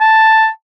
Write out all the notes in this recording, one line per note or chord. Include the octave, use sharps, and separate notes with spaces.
A5